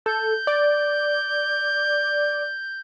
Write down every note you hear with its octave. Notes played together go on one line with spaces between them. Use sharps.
A4 G6
D5